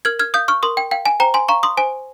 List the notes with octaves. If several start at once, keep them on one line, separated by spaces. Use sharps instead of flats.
A#4 F6 G#6
F6 G#6
F5 D#6 G6
C#6 F6
A#4 C6 D#6
G5
F5 G5
G#5
C5 G5 A#5
G#5 C6
F5 A#5 C#6
C6 D#6
C5 G#5